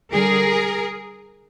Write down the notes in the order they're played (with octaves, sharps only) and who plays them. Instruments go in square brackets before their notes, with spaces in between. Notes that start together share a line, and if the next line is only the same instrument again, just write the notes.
[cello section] D3 G3 G#4 A#4